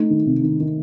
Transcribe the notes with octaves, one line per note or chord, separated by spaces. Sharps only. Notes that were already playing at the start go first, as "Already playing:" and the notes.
Already playing: A3 D#4
D#3
C3
D#3
D#3